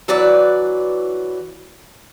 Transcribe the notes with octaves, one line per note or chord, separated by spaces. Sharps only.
E3 F#3 B4 D5